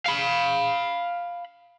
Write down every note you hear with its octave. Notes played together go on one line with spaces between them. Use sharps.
F5 B5